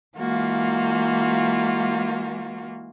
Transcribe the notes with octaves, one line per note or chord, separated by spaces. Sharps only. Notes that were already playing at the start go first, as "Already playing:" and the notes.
E3 G#3 A#3 F4 F#4